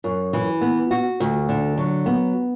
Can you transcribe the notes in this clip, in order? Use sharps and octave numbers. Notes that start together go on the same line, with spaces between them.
F#2
E3
B3
F#4
D2
D3
F#3
B3